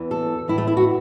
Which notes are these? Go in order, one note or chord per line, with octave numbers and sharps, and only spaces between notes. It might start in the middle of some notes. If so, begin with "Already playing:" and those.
Already playing: E2 E3
A4
A2 E3 E4
A3
E4
F#4